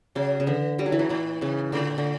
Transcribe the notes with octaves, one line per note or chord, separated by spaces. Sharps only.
C#3 F#3
C#3
D3 E3
C#3 G3
F#3
E3
G2 F#3
A2 E3
G2 C#3
A2 D3
D3